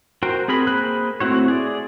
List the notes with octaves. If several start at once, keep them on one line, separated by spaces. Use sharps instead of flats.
F#4 A#4 C5 G5
C4 G#4 A#4 B5
A#3 G#4 C5 B5 F#6
A3 C4 E4 F#4 C#5
G#4 D5